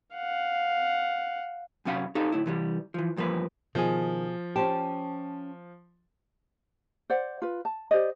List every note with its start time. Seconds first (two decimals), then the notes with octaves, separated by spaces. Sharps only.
0.14 F5 F#5
1.85 F#2 C3 C#4 F5 F#5 B5
2.15 D#4 G4 A4 F5
2.32 D2 A2 E4
2.46 C3 E3 G3
2.94 E3 F3
3.16 E2 G2 F3 A#3 B4
3.75 B2 D#3 F3 G#4
4.56 C#4 G4 C5 A5
7.10 C5 D5 F#5
7.42 F4 B4
7.65 A5
7.91 G4 C5 D5 D#5